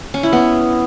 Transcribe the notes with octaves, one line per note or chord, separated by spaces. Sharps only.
C#4
E4
B3